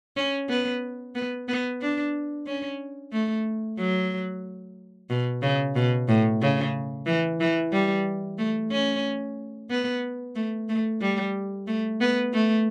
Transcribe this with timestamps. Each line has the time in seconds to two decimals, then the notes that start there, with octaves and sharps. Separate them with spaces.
0.17 C#4
0.49 B3
1.15 B3
1.48 B3
1.82 D4
2.46 C#4
3.13 A3
3.78 F#3
5.10 B2
5.42 C#3
5.76 B2
6.08 A2
6.42 C#3
7.07 E3
7.41 E3
7.73 G3
8.38 A3
8.71 C#4
9.70 B3
10.36 A3
10.69 A3
11.01 G3
11.67 A3
12.01 B3
12.33 A3